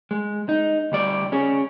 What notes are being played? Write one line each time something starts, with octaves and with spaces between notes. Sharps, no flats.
G#3
D#4
D2 G3 D5
C#4 G#4